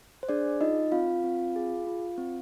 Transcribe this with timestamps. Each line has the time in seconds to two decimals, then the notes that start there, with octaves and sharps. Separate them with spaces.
0.23 C5
0.29 D4 G#4 D5
0.60 D#4 F4 D#5
0.92 C4 F4 F5
1.24 C4
1.56 G#4
1.87 F4
2.18 C4